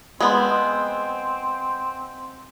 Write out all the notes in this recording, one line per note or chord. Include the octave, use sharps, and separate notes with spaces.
G#3 B3 C4